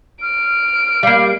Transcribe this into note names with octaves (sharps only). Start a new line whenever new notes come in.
F6 D7
G3 A#3 F5